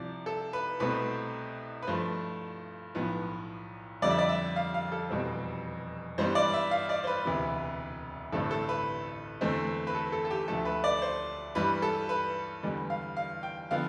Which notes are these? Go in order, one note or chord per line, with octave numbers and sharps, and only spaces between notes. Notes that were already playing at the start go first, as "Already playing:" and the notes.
Already playing: C2 C3 F3 D5
A4
B4
C2 B2 A3 C4 B4
B4
G2 F3 A3 C5
B1 A2 F3 B3
F2 D3 G3 D5
E5
D5
E5
F5
F5
A4
F1 E2 B2 G3 C4
G2 E3 G3 B3 C5
D5
E5
F5
D5
C5
B4
E1 D2 C3 E3 B3
A1 G2 D3 A3 C4 A4
A4
B4
E2 D3 A3 C4
B4
A4
A4
A4
G4
D2 D3 F3 A3 A4
B4
D5
C5
G2 E3 G3 B4
A4
B4
E2 D3 G3 B3
F5
F5
G5
D3 F3 B3 F5